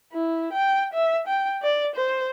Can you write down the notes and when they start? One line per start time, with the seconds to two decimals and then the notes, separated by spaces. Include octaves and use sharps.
0.13 E4
0.53 G5
0.94 E5
1.28 G5
1.63 D5
1.96 C5